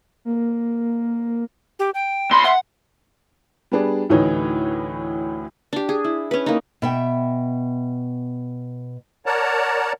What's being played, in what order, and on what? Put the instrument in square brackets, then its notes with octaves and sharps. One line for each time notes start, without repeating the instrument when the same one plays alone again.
[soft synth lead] A#3
[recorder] G4
G5
[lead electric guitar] A#2 B5 [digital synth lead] C6
[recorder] E5 [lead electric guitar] F#5
[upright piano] G3 B3 D4 G#4 D5
D2 A2 E3 D#4 B4 C#5
[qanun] D4 G4
G#4
E4
C#4 B4
A#3 D#4
[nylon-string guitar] B2 E5 G5
[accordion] A#4 C#5 D5 F#5 A5 A#5